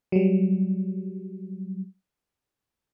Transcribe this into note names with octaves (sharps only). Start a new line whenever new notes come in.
F#3 G3